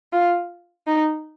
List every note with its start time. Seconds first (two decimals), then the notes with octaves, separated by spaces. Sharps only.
0.13 F4
0.87 D#4